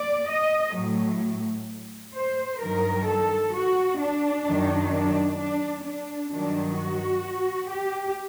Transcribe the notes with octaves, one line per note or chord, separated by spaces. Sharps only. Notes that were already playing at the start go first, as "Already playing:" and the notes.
Already playing: D5
D#5
A2 F#3
C5
G2 D#3 F#3 A#4
A4
F#4
D4
F#2 D#3 F#3
D4
D4
D4
G2 D#3 F#3 D4
F#4
G4